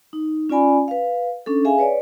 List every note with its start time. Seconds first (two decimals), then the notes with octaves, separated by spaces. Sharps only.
0.13 D#4
0.49 C#4 F4 D5 G#5 B5
0.88 B4 F5
1.46 C#4 D4 A4
1.65 G#4 E5 F5 G#5
1.78 B4 C#5 D5